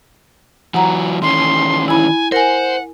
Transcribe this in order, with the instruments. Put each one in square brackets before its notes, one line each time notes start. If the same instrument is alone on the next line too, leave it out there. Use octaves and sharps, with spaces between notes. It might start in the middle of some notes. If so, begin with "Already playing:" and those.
[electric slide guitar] E3 F#3 [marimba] F#5 A#5
[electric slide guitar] D#3 E3 C#4 [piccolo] C6
[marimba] E4 B5 [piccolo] G#5
[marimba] A#4 G#5 [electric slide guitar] C5 [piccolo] F#5